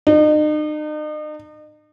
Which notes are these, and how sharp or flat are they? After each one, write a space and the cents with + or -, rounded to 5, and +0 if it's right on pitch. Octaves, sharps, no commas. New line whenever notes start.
D#4 -40